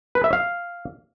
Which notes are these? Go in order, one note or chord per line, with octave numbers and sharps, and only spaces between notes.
B4
E5
F5